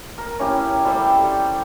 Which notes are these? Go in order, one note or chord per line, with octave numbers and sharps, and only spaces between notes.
A#4
C#4 E4 G4
G3 A4 C5 G5